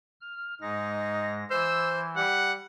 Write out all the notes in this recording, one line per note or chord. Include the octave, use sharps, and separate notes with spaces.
F6
G#2 G#3 D#4 A#6
E3 C5 E6
G3 F#5